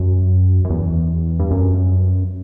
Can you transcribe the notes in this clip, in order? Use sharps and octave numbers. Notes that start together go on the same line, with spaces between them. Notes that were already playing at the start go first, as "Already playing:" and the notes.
Already playing: F#2
F#2
E2
G2
F#2